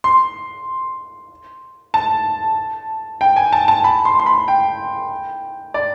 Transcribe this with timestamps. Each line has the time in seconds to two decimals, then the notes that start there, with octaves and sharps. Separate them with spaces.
0.04 C6
1.94 A5
3.21 G5
3.36 G#5
3.53 A5
3.68 A5
3.84 B5
4.05 C6
4.19 C6
4.26 B5
4.48 G5
5.74 D5